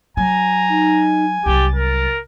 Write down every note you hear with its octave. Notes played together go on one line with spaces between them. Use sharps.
F#3 G#5 A#5
D#4
C2 F#3 G4 A6
A#4